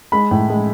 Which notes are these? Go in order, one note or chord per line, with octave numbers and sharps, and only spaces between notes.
G#3 B5
A2
G#3